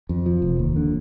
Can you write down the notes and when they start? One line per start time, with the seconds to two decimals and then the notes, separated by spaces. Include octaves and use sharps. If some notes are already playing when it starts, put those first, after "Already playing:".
0.09 F2
0.26 F3
0.42 F1
0.59 D#2
0.76 D3